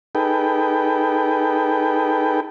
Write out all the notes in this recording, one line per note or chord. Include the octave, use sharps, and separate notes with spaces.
D#4 G#4 A4 B4 G5